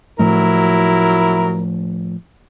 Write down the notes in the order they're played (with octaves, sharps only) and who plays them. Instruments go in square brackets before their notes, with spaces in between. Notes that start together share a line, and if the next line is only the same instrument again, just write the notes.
[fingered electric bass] A2 F3 A3 [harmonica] F#3 E4 A#4